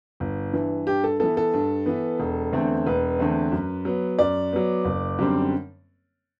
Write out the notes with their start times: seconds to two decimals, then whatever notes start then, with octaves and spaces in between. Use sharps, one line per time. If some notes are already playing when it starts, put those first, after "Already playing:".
0.20 G1
0.54 G2 E3
0.87 G2 G4
1.04 A4
1.20 E3 B3 A4
1.37 A4
1.54 G2
1.86 E3 B3
2.20 E1
2.53 E2 D3 A3 C4
2.86 E1 B4
3.19 E2 D3 A3 C4
3.52 F#2
3.85 F#3 B3
4.19 F#2 D5
4.53 F#3 B3
4.85 F#1
5.18 F#2 D3 G3 C4